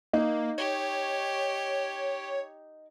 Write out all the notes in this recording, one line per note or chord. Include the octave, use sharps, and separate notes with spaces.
A#3 D#4
G4 C#5